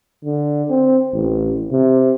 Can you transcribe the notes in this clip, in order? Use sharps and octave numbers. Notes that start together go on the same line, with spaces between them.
D3
C4
A1
C3